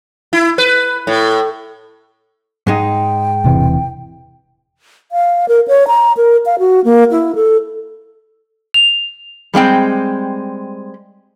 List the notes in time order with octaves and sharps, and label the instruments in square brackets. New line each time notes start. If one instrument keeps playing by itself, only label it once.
[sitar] E4
B4
A2
[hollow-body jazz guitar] G#2 G#3 D#4 [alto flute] G5
[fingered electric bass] E1 C3 E3
[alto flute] F5
A#4
C#5
A#5
A#4
F5
F#4
A#3
E4
A4
[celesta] F7
[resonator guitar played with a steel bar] G3 G#3 C4 G5